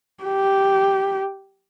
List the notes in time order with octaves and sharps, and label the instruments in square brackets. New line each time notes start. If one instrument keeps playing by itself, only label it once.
[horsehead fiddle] G4